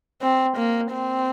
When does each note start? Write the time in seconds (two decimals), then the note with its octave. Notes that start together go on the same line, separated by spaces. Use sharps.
0.22 C4
0.57 A#3
0.92 C4